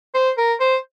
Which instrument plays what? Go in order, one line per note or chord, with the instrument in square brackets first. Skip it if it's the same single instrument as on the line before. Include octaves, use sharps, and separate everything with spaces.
[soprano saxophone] C5
A#4
C5